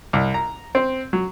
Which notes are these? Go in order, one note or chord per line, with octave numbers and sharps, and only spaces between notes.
C2
A#5
C4
F#3